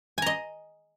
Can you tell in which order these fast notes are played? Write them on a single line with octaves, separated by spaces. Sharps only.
G#5 A#5 D#5